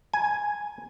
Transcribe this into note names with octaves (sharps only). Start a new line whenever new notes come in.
G#5